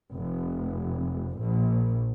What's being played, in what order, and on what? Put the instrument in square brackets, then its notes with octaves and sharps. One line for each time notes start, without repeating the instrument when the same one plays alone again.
[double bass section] F1
A#1